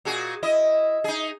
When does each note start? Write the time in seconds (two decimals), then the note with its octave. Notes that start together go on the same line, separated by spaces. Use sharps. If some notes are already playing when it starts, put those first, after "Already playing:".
0.05 A#2 F#4 G#4
0.43 E4 D#5
1.04 D#4 G#4